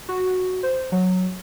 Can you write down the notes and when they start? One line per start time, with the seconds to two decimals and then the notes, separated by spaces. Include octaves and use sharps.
0.09 F#4
0.63 C5
0.92 F#3